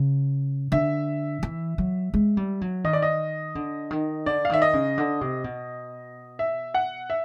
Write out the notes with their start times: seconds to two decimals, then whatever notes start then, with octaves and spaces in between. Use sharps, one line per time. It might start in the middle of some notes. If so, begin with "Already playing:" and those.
Already playing: C#3
0.72 D3 E5
1.43 E3
1.78 F#3
2.14 G#3
2.37 G3
2.61 F#3
2.84 D#3 D#5
2.93 D5
3.02 D#5
3.55 D3
3.91 D#3
4.26 D3 D5
4.45 F5
4.50 D#3 E5
4.62 D#5
4.73 C#3
4.98 D3
5.21 C3
5.44 B2
6.39 E5
6.74 F#5
7.10 E5